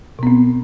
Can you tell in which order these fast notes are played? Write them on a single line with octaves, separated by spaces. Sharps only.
B2 B3 C4